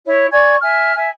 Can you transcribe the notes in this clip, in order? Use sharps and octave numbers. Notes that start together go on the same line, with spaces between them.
E4 C#5
D5 G#5 C#6 G#6
E5 G#5 F6
E5 G#5